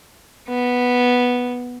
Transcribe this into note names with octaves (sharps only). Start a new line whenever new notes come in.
B3